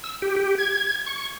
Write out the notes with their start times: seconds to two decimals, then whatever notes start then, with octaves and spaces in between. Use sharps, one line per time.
0.04 E6
0.22 G4
0.36 G4
0.58 G#6
1.06 C#6